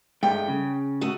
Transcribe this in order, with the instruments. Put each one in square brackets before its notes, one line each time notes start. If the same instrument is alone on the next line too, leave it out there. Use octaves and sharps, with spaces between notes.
[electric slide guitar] G2 G#3 A3 [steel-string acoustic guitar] G5
[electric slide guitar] C#3
[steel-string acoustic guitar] A3 F#4 D#5